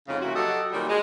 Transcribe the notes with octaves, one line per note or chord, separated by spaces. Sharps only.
F2 G#2 C#3
A#2 E4 F#4
F#3 F#4 G4 A4 D#5
A#2 D#3 F#3 G3
G#3